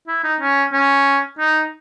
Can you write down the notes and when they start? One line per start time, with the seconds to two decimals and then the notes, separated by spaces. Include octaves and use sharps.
0.07 E4
0.24 D#4
0.40 C#4
0.73 C#4
1.39 D#4